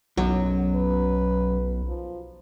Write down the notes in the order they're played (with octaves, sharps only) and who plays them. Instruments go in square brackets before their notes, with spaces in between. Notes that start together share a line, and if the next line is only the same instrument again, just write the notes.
[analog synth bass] B1 [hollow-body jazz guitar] F#2 [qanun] F#3
[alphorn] B4
F3